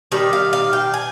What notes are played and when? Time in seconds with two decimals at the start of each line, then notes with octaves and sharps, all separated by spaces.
0.12 D#3 G3 G5
0.33 F5
0.53 F5
0.73 G5
0.94 G#5